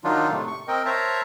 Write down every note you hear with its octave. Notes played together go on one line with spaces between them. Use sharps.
D#3 F#3 D4 D#4 F4
A2 C3 A3
C#6
C4 A#4 D#5 G5
A#4 C5 C#5 E5 A5 A#5